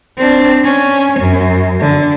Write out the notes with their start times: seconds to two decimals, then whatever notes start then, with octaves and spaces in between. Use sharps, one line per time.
0.17 C4 D4
0.64 C#4
1.20 F#2
1.80 D3